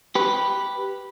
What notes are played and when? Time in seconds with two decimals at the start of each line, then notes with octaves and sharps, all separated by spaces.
0.15 G4 B4